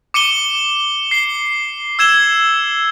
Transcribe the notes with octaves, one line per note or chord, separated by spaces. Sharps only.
D6 C#7 D#7 G7
C7 G7
E6 G#6 E7 G7